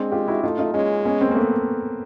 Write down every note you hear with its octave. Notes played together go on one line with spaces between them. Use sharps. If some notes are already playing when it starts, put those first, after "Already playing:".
Already playing: G#3 C4 D4
F4 G4
E4 F#4
A3 D#4 F4
D#4 F4
G#3 C#4 D#4
B3 C#4
A#3 C4
A#3
A3 B3